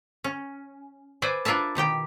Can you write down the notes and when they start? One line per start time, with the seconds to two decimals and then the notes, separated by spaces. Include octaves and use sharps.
0.24 C#4
1.22 B4 C5 D5 E5 G#5
1.45 D4 E4 F4 A#4 E5 A5
1.75 B2 D#3 G4 G5